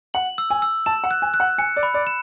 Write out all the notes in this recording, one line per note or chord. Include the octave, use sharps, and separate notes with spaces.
F#5 F#7
E6
G#5
E6
A5 E7
F#5
F#6
G#5
F#6
F#5
G#5 C#7
D5
B5
D5
E7